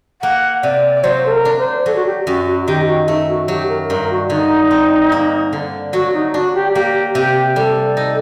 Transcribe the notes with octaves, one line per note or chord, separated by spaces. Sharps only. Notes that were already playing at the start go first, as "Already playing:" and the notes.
A#3 F#5
C3 D5
D5
F#3 C5
A4
A#4
D4
C5
F#3 A4
F#4
G4
F#2 F#4
F#4
D#3 G4
F#4
A3 D#4
F#4
F#3 G4
A#4
G2 A#4
F#4
D3 D#4
C4
A#3
D3
F#3 F#4
D#4
D4 F#4
G4
A#3 G4
C3 G4
G3 A4
D#4